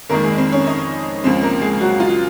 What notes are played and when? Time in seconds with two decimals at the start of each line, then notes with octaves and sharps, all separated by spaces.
0.09 F1 F2 D#3 G#3 A#3 A#4
0.23 G#3 G#4
0.38 C4 C5
0.52 C#4 C#5
0.66 D#4 D#5
1.24 C#2 C#3 F3 G#3 C4 C5
1.42 A#3 A#4
1.61 G#3 G#4
1.80 F#3 F#4
2.00 F4